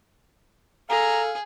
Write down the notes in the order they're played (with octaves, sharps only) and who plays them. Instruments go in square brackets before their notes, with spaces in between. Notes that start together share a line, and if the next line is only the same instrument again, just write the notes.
[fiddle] G#4 [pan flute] A4 [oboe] F5 [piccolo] A#5